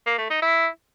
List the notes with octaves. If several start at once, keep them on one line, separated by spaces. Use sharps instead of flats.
A#3
A3
D#4
E4